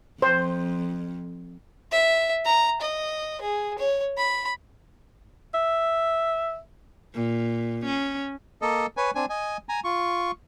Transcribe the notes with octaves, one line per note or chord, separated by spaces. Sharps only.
F2 C5
E5
A#5
D#5
G#4
C#5
B5
E5
A#2
C#4
A#3 A4 D#5
B4 C#5 G#5
C4 D4 G#5
D#5 G#5
G#5 A#5
F4 C#6